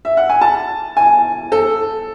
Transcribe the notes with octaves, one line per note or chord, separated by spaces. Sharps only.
E5
F#5
G#5
A5
G#5
A4